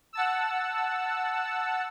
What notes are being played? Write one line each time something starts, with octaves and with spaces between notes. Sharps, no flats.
F#5 A5 E6